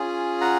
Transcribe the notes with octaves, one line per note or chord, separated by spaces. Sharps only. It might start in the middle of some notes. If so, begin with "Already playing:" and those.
Already playing: C#4 F4 G#4
F#5 A#5